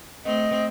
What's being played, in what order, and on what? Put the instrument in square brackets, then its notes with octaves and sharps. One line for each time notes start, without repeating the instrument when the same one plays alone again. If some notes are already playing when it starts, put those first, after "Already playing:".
[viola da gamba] A3 C4 [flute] D#5